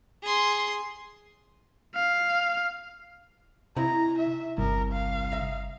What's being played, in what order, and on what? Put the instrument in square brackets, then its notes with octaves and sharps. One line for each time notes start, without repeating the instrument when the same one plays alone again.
[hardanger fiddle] G#4 C6
[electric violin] F5
[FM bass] C3 [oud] D#4 E4 [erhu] A#5
[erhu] E5
[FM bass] G1 [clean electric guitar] C2 [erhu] A#4
[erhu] F5
[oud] D#4 E5